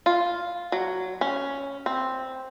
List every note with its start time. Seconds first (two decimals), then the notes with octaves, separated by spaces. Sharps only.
0.06 F4
0.72 F#3
1.21 C#4
1.86 C4